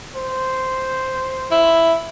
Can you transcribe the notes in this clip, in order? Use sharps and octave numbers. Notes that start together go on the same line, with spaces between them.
C5
E4